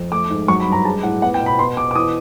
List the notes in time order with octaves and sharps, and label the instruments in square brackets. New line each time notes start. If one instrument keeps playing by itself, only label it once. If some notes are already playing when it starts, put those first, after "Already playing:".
Already playing: [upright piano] F2
A3 D6
G#2
F#3 C#6
B5
G2
A#5
G#3 A5
A2 F#5
B3 F#5
G5
B2
B5
B3 C6
B2 D6
D6
E3 D#6